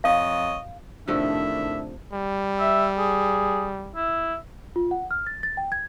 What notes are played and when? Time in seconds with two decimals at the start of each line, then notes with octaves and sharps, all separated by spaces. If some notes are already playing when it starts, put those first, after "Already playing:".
0.04 F2 C#5 D#5 F5
1.08 A2 C3 D#3 F3 A3 D4 E5
2.13 G3
2.60 E5
2.98 G#4
3.96 E4
4.76 F4
4.91 F#5
5.11 F6
5.27 A6
5.43 A6
5.57 G5
5.72 G#6